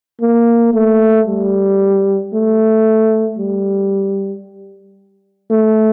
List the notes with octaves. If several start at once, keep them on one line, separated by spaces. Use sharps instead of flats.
A#3
A3
G3
A3
G3
A3